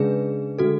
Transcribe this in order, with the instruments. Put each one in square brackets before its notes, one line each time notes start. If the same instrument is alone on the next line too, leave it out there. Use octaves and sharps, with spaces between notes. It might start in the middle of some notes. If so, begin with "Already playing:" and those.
Already playing: [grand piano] C#3 G#3 D4 [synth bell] G#4 B4
[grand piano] D3 G#3 [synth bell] F#4 A4